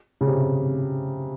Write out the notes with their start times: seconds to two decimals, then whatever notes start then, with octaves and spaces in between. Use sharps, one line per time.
0.21 C#3
0.27 C3